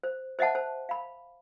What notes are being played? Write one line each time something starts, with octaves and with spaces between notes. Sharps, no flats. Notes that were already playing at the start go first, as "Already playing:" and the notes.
C5
C5 D#5 E5 F#5 A5
C5 A5
F5 B5